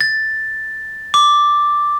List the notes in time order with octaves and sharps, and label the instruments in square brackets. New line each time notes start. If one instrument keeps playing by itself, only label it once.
[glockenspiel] A6
D6